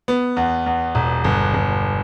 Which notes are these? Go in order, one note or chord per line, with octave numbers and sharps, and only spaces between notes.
B3
E2
E2
E1
G1
G1